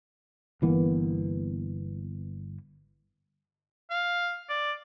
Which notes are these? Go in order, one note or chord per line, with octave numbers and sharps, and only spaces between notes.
G1 E3 A#3 B3
F5
D5